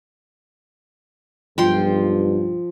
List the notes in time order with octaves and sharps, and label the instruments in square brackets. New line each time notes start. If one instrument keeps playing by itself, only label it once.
[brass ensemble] B1 G2 [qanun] F3 G5 C6